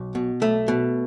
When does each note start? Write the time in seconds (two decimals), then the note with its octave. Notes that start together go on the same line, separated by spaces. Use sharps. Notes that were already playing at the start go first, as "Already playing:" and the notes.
Already playing: B1
0.15 B2
0.42 B1 A3
0.68 B2